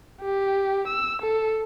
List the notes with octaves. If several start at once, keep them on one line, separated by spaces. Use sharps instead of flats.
G4
E6
A4